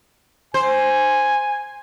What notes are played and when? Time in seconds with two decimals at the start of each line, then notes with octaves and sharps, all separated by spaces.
0.54 C5 G#5